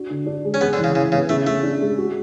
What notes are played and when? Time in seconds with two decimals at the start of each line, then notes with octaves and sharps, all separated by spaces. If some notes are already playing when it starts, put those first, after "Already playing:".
Already playing: D4 F#4
0.10 D3
0.26 D4
0.45 G#3
0.54 C#4
0.61 B3 G#4
0.73 D3
0.78 E3
0.84 C#3
0.95 C#3 E4
1.12 C#3 B3
1.29 C#3 A3
1.46 C#3 A3
1.63 D4
1.81 G#3
1.98 F#4